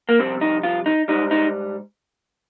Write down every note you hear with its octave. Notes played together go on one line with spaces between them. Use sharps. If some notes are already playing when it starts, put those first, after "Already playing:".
A#3
F2 C3 G3 C4
D#4
F4
D#4
G#2 G3 D#4
D#4